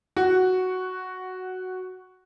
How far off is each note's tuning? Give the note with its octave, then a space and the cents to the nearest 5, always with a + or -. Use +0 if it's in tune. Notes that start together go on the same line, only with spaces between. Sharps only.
F#4 +0 F#5 +10